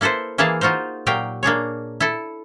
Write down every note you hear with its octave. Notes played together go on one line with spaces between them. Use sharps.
A#3 E4 A4 B4 C5
E3 A#3 E4 G#4 F5 A5
D#4 F4 F#4 A#4 C5
A#2 F#3 G4 A#4 F5 G5
A#3 D4 G#4 C#5
E4 A4